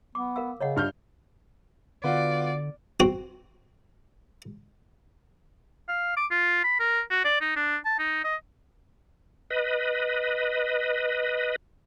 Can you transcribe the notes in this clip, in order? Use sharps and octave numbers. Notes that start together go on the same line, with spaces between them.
B3 D6
A#4 F5 E6
C#3 C#5 D#5 F#5
G2 F6 G6
D3 B3 F4 F#4 D5
C4 F#4
F5
D6
F4
B5
A#4
F#4
D5
D#4
D4
A5
D#4
D#5
B4 D#5